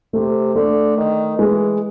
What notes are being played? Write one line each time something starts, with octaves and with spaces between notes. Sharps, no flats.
C3 A3
D3 A3
D#3
E3 G#3